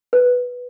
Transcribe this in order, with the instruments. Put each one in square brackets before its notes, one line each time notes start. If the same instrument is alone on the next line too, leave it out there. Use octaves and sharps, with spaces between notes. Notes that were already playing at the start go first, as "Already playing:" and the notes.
[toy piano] B4